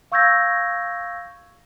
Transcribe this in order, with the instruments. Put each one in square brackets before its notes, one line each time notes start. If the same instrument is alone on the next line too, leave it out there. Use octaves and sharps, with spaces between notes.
[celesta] F5 C#6 E6 G6 G#6 A#6